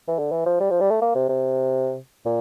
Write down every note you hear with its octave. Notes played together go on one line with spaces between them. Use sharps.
E3
D3
E3
F3
G3
F3
G3
A3
A#3
C3
C3
A#2